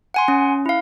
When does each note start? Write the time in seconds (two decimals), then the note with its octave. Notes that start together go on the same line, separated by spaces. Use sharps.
0.14 F#5 G#5 C6
0.28 C#4
0.66 E4 F5